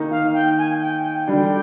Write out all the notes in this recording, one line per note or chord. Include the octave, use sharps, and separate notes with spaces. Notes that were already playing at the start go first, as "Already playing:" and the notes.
Already playing: D#3 A#3 D#4
F5
G5
G#5
G5
G5
D3 G3 D4